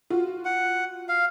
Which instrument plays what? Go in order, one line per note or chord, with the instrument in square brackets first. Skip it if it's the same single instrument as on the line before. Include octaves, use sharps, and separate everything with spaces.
[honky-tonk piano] F4 F#4
[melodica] F#5
F5